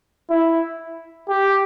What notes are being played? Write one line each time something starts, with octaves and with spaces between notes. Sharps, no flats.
E4
G4